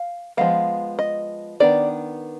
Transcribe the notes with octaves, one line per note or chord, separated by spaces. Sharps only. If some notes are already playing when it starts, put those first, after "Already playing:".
Already playing: F5
F3 G#3 B3 F5
D#5
D#3 B3 D4 D5